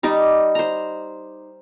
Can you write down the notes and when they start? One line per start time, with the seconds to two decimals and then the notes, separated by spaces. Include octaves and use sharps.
0.03 G3 D#4 D5 D#5
0.55 C5 A#5